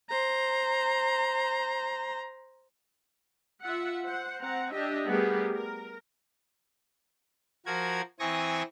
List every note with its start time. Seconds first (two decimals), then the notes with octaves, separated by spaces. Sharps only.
0.10 C5 A#5
3.62 F4 E5 F#5
4.05 C5 F#5
4.41 C4 F#5 A#5
4.72 D4 G4 D#5 E5
5.07 G3 A3 B3 G4 G#4 A#4
5.54 A#4
7.66 F3 F#4 A#4 G#6
8.20 E3 C4 G#5 C#6 D#6 A#6